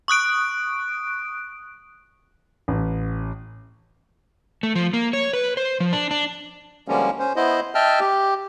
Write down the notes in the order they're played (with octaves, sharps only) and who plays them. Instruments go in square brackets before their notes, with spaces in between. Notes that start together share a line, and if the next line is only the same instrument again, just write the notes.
[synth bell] C#6 D#6 F#6 D7
[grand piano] A1
[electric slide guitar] A3
F3
A#3
C#5
B4
C5
F3
D4
D4
[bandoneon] D3 F3 G3 G#3 A#3 C#4
C#4 C5
B3 E4 C5 D#5
D#5 E5 G5 A5 F6
G4